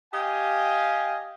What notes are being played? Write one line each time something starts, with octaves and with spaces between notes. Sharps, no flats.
G4 D#5 F5 G5 G#5